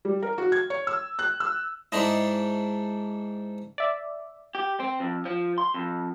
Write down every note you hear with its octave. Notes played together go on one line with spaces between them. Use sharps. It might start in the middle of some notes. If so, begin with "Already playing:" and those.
G3
A#4
F#4
G#6
C#5
E6
F#6
E6
G#2 D4 E4 D#5
D5 E5
G4
C4
F2
F3
C6
F2